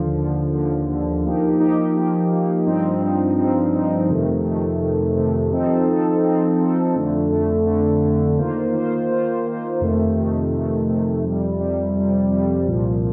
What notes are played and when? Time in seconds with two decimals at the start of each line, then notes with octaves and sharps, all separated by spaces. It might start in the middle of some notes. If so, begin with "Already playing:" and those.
Already playing: D#2 D3 F3
0.16 D#2 D3 F3
0.52 D#2 D3 F3
0.88 D#2 D3 F3
1.23 F3 A#3 D#4 G4
1.60 F3 A#3 D#4 G4
1.94 F3 A#3 D#4 G4
2.30 F3 A#3 D#4 G4
2.66 G2 F3 C4 D#4
3.01 G2 F3 C4 D#4
3.37 G2 F3 C4 D#4
3.73 G2 F3 C4 D#4
4.09 F2 C3 D#3 A3
4.44 F2 C3 D#3 A3
4.80 F2 C3 D#3 A3
5.16 F2 C3 D#3 A3
5.51 F3 C4 D#4 A4
5.88 F3 C4 D#4 A4
6.23 F3 C4 D#4 A4
6.60 F3 C4 D#4 A4
6.95 F2 D3 A3
7.31 F2 D3 A3
7.66 F2 D3 A3
8.02 F2 D3 A3
8.38 D#3 A#3 F4 C5
8.73 D#3 A#3 F4 C5
9.09 D#3 A#3 F4 C5
9.45 D#3 A#3 F4 C5
9.81 F2 C3 D#3 A3
10.16 F2 C3 D#3 A3
10.52 F2 C3 D#3 A3
10.88 F2 C3 D#3 A3
11.23 F2 C3 G3
11.59 F2 C3 G3
11.95 F2 C3 G3
12.30 F2 C3 G3
12.66 C2 A#2 F3